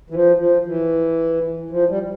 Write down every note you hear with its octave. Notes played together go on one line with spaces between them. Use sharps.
E3
F3
F3
E3
F3
G3